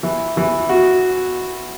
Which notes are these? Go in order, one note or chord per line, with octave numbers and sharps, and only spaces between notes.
E3
E3
F#4